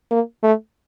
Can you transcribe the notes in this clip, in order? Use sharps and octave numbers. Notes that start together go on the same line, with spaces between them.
A#3
A3